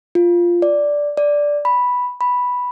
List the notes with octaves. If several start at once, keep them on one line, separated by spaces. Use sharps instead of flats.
F4
D5
D5
B5
B5